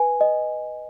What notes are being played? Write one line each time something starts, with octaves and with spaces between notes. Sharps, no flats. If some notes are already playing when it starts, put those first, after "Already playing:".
Already playing: B4 G#5
D#5